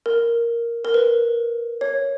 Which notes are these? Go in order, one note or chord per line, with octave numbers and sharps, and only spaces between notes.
A#4
A#4
B4
C#5